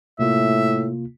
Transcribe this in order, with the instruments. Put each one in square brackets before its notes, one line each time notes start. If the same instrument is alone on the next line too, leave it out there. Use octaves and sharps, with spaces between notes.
[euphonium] A2 [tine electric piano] C3 A#3 F4 [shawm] E5